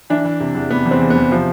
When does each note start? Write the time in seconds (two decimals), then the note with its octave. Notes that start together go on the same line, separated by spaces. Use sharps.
0.10 E3 D4
0.24 E3
0.40 C3
0.55 E2
0.70 C3 B3
0.86 E2
0.91 C4
1.00 E2
1.10 B3
1.16 E2
1.31 C3 F3